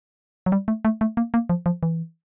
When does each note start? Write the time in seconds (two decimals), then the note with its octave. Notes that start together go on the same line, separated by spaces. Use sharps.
0.46 F#3
0.52 G3
0.68 A3
0.85 A3
1.01 A3
1.17 A#3
1.34 A#3
1.49 F3
1.66 F3
1.83 E3